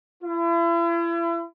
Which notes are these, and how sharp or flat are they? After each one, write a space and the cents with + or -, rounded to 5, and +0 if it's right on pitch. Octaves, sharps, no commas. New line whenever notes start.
E4 +40